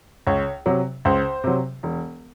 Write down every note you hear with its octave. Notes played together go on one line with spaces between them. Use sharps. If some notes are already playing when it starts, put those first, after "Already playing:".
C#2 C#5
C3 F#3
C#2 C5
C3 F#3
E1